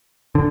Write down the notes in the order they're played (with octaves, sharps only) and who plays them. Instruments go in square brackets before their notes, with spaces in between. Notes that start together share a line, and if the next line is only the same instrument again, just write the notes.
[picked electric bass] D3